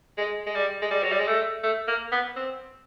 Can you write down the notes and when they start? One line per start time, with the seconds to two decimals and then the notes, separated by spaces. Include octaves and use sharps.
0.18 G#3
0.47 G#3
0.55 G3
0.82 G#3
0.91 G3
1.03 F#3
1.12 G3
1.19 G#3
1.28 A3
1.64 A3
1.88 A#3
2.12 B3
2.36 C4